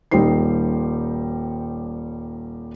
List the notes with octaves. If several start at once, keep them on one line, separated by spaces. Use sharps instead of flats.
D#1 G3 D#4 C5 C7